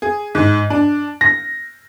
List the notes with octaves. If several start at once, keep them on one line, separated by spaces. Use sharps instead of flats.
G#4
G#2
D4
A#6